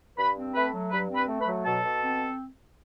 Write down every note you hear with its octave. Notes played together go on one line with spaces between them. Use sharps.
G2 B4 B5
C4
A3 B4 B5
F#3
G2 B4 B5
C4
B4 B5
A3
B4 B5
F#3
B2 A4 A5
B2
C4